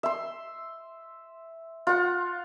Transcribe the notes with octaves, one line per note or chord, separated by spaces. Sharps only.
E5 C6
F4 F#5